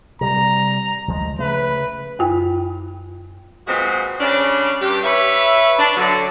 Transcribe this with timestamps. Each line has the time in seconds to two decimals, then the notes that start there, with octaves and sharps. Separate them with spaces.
0.21 C3 G3 A#5
1.08 D2 F3 G#3
1.39 C#3 A3 B4
2.19 F#2 F4 G5
3.67 A#2 F3 G#3 B3 C4 F#4
4.20 C#3 G3 C#4 D4
4.81 G2 G4
5.04 B4 C#5 E5
5.79 D4
5.96 D3 F#3